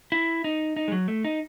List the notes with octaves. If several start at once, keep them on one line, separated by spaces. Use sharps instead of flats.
E4
D#4
D#4
G#3
F#3
A3
D#4